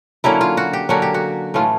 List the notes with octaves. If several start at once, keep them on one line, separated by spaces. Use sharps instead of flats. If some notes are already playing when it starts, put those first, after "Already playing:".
D3 F#3 A#3 C#4 E4
F4
F#4
G4
D3 F#3 A#3 C#4 F#4
G4
F#4
A2 E3 A3 C#4 F4